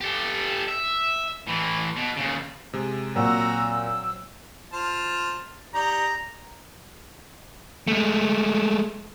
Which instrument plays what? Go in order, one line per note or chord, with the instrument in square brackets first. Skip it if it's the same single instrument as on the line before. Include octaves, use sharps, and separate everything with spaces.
[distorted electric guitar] G4 A4
E5
A2 E3
B2
D#2 C#3
[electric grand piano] C3 G#3
[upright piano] A#2 [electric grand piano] F#3 C4 [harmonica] F#4 F#5 A#5 [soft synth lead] E6
[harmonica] F4 C5 A5
[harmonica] D#4 G4 D5 [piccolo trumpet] A#5
[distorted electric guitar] G#3 A3